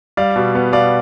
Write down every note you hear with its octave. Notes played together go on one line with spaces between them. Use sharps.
G3 D5 F5
B2
B3
B2 D5 F5